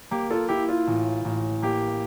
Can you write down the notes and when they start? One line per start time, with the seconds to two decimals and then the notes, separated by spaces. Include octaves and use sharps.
0.11 A#3 G4
0.30 F4 A4
0.49 E4 G4
0.69 F4
0.87 A1
1.25 A1
1.62 A#3 G4